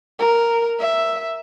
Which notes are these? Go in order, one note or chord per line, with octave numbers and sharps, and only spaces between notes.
A#4
E5